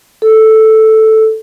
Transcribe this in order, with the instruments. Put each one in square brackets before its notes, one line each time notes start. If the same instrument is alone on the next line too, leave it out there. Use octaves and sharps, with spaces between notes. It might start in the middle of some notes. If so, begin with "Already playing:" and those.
[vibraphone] A4